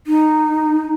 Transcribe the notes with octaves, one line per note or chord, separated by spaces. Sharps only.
D#4